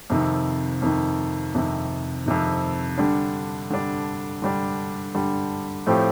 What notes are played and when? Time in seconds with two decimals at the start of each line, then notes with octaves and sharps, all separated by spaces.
0.10 F2 C3 D#3
0.82 F2 C3 D#3
1.54 F2 C3 D#3
2.26 F2 C3 D#3
2.98 D3 G3 D4
3.70 D3 G3 D4
4.42 D3 G3 D4
5.15 D3 G3 D4
5.86 A2 F3 A3 C4 G4